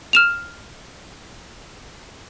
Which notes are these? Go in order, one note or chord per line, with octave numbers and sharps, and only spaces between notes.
F6 E7 F7